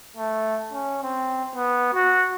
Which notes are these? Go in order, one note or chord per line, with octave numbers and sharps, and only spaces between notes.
A3
C#4
C4
B3
F#4